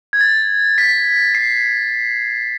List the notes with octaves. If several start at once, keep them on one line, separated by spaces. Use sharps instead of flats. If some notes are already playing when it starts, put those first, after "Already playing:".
G#6
A6
B6
C7